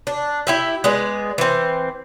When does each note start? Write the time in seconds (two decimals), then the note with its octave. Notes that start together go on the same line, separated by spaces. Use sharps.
0.07 D4
0.47 E4 G4 E5
0.84 G#3 B3 G#4 D5
1.38 E3 C4